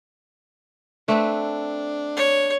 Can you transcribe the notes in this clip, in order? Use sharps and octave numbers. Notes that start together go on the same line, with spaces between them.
A3 C4 D4 B4
C#5